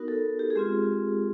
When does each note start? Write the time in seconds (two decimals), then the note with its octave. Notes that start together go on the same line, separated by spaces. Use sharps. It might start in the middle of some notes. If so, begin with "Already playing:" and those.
Already playing: B3 D#4 F#4 A#4
0.08 A4
0.39 G4
0.50 G#4
0.55 G#3 C4 F4 G4